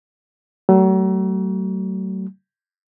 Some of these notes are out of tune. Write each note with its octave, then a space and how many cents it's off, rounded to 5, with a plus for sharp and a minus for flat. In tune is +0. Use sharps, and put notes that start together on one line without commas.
F#3 +40 A3 +20